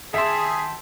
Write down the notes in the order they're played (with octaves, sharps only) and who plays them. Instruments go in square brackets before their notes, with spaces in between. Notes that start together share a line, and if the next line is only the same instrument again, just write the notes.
[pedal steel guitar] D#3 G4 A5 [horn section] G#4 [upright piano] E5 [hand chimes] C6 B6